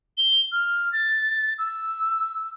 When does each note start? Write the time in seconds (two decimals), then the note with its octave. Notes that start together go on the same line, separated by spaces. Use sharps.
0.18 G7
0.52 F6
0.93 A6
1.58 E6